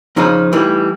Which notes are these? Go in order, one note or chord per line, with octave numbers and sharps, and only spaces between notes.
F2 C#3 F3 D#4
A2 E3 G3